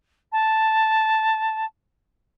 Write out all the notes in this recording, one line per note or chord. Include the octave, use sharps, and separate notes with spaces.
A5